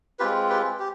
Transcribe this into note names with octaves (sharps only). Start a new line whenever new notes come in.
G#3 C4 F4 G4 B4
G4 B4
G4